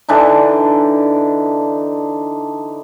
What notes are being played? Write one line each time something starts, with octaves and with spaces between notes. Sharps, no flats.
D3 E3 D4 D#4